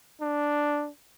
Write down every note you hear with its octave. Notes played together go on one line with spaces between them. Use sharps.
D4